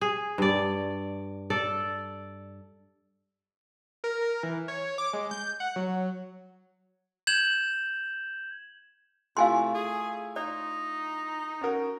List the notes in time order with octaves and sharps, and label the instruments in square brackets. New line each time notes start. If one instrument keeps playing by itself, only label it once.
[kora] G#4
G2 D5
A4 D5
[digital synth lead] A#4
A#4
E3
C#5
D6
G#3
G6
F#5
F#3
[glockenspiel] G6 G#6 E7 F#7
[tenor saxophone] C3 [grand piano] A3 E4 F4 [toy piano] F5 G#5 C6
[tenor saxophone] G#4
[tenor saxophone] D#4 [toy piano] D5
[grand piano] C#4 F#4 A#4